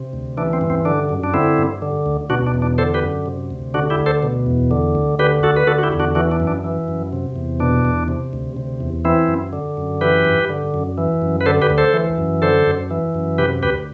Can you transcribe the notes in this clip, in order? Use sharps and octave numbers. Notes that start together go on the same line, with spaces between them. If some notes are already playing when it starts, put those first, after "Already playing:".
Already playing: C3
D2
E3 D4
C4
G2
C4
D3 D4
F#2
D4
D3 C4 E4
G2
D3
D2
B2 D4 F#4
D4
E2
D4
D3 A4 C5
G4 B4
F#2
C3
D2
D3 D4 F#4
E4 G4
D2
A4 C5
B2
E2
D3
D2
D3 G4 B4
D2 F#4 A4
B4
D3 F#4 A4
F#4
E4 G4
E2
D4 F#4
E3 D4 F#4
D4
F#2
D4
E3
F#2
C3
E2
B2 D4
E2
C3
D2
C3
E2
E3 C4 E4
F#2
D3
F#2
E3 G4 B4
G2
D3
F#2
E3
F#2
B4
D3 A4 C5
G4 B4
D2
A4 C5
E3
F#2
D3 A4 C5
F#2
E3
F#2
C3 G4 B4
D2 G4 B4